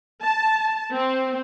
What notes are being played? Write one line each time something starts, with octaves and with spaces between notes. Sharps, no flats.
A5
C4